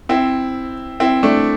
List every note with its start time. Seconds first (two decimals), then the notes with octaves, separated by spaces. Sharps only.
0.09 C4 E4
1.00 C4 E4
1.23 A3 D4